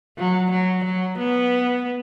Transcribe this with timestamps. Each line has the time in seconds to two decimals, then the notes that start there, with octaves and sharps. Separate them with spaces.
0.18 F#3
0.51 F#3
0.85 F#3
1.18 B3